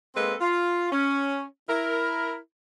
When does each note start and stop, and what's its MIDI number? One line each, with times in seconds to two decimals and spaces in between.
0.16 0.35 56
0.16 0.35 58
0.16 0.35 60
0.16 0.35 69
0.16 0.35 71
0.41 0.89 65
0.92 1.43 61
1.69 2.37 64
1.69 2.37 70